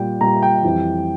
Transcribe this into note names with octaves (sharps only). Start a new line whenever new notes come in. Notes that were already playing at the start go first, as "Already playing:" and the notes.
Already playing: A#2 G3 G5
A#2 G3 A#5
G5
F2 E3 G3